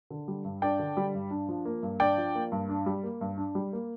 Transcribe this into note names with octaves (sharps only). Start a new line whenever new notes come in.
D3
G3
G2
D4 D5 G5
D3
G3
G2
D4
F3
A#3
G2
D4 D5 G5
F3
A#3
G2
D4
G3
A#3
G2
D4
G3
A#3